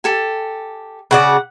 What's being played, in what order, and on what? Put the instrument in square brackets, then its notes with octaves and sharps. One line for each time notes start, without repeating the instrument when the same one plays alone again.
[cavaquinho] G4 A4 G#5
[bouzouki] C#3 F#4 D5 [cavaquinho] F#5